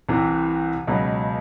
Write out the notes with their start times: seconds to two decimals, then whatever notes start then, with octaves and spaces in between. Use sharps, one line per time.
0.09 C2 C3 E3
0.87 C#2 B2 F#3